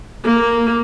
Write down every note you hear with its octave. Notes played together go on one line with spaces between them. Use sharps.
A#3